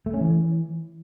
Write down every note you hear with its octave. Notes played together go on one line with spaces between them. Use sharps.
A3
C#4
E3